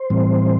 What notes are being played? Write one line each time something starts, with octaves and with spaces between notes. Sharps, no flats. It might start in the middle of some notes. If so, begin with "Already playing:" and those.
Already playing: C5
A2 E3 G3 C4